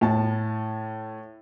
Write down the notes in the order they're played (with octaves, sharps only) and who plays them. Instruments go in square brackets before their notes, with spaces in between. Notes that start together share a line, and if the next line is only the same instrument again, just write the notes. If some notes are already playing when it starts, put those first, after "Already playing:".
[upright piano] A2 A5